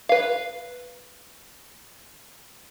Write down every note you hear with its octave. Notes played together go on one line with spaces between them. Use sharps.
B4 F5